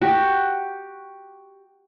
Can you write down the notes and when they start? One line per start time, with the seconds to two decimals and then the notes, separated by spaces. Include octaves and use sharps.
0.02 F#4 G4